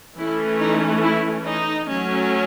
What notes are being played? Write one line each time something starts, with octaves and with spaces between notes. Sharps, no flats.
E3 A3 C#4 E4
D#4
E4
D#4
F#3 A3 C#4